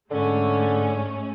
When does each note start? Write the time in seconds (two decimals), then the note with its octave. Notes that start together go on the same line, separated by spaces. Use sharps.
0.11 G#2 D3 A3 C#4